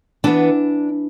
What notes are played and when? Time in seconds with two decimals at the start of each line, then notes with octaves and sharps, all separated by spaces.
0.24 E3 B3 D4